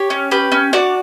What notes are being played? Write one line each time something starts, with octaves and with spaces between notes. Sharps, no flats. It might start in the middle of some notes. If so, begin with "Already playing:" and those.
Already playing: G4 C#5
C#4
G4 B4
C#4
D4 F#4 D5